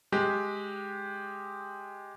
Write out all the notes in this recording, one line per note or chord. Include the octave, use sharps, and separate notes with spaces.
G#3 G4